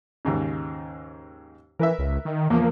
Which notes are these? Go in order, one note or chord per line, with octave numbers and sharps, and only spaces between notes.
D#2 G#2 C#3
E3 A#4 B4 E5
C#2
D#3
E2 F3 A#3